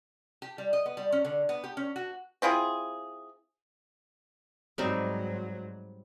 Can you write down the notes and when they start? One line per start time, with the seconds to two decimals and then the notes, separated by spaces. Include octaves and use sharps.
0.42 G4
0.58 G3
0.73 D#5
0.86 B3
0.97 G3
1.12 C#4
1.25 D3
1.49 B3
1.64 G4
1.77 C#4
1.96 F#4
2.42 C4 E4 F4 G#4
4.78 G#2 F#3 G3 C4 D#4